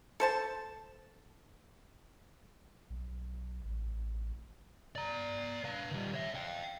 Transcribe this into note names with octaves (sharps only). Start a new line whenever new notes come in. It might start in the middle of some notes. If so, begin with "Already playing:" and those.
A4 C5 A5
B1
A1
D5 A#5
B4 F5
D#3 G3
C#5 E5
F5 G5